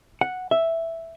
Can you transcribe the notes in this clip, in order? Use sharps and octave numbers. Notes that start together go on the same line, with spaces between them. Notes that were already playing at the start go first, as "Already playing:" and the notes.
F#5
E5